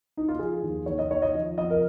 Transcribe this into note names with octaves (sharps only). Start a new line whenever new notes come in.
D#4
F4
F3 G#4
D#2
D#2 C#5
D#5
D#3 C#5
D#5
F3
F2 D#5
A#4